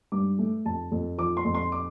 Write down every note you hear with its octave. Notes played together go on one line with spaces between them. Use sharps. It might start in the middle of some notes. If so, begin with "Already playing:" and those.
G2 D6
A3
F2 A5
F2
F3 D6
C6
F2
C6
D6